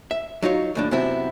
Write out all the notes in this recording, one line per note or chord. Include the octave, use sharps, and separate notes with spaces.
E5
F#3 D#4 F4 C#5
D#2 A2 D4
F#2 C3 B3 C4 E4